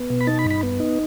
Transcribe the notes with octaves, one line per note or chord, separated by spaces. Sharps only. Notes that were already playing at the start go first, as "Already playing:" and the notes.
Already playing: B3
B2
B5
D#4 A5
B5
G2
B5
B3
D#4